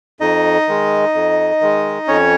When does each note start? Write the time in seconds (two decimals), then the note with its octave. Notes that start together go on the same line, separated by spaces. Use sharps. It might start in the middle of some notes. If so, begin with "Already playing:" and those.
0.20 F2 D#4 D#5
0.68 D#3 G#3
1.14 F2
1.61 D#3 G#3
2.07 F2 C#4 C#5